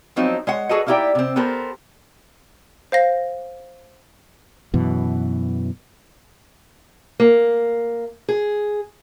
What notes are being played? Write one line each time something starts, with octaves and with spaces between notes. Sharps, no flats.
F3 F#3 C4 D#4
G#3 C#5 F#5
F#4 G#4 A4 B4 D#5
A#3 D#4 E4 G4 D5 G5
C3 C4
B3 G4 A4 A#4 C5
C5 F5 A#6
F#2 B2 E3
A#3
G#4